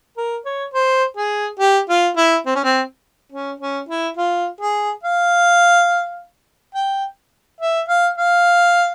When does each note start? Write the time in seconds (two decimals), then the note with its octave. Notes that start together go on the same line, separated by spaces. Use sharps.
0.17 A#4
0.45 C#5
0.74 C5
1.17 G#4
1.60 G4
1.89 F4
2.17 E4
2.46 C4
2.55 C#4
2.64 C4
3.32 C#4
3.60 C#4
3.89 E4
4.17 F4
4.61 G#4
5.03 F5
6.75 G5
7.61 E5
7.89 F5
8.18 F5